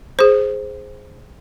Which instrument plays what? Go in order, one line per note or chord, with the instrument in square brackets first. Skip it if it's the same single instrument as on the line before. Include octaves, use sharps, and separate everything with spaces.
[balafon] G#4 C5